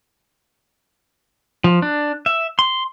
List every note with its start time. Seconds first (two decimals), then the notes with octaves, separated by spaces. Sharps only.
1.64 F3
1.82 D4
2.26 E5
2.59 C6